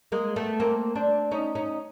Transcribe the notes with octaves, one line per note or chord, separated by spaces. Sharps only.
G#3 A#3
A3 B3
A#3 C4
C4 D4
C#4 D#4
C#4 D#4